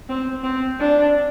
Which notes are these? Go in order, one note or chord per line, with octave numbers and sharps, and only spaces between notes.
C4
C4
D4